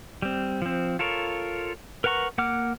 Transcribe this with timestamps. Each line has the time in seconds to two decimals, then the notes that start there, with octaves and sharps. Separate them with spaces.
0.22 G3 C4
0.62 F3 C4
0.99 F4 A4 A#4 C#5
2.04 A#4 B4 F#5 A#5 C#6
2.38 A#3 F#5 D6 F6